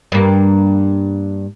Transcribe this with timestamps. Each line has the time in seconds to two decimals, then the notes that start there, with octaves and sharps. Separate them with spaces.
0.12 G2 A#3